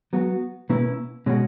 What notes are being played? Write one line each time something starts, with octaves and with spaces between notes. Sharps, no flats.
F#3 B3 F#4
B2 A#3 C#4 E4 B4
B2 G#3 C#4 F#4